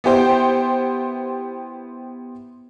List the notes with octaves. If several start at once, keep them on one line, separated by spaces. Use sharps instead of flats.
B3 E4 G4 C5 G5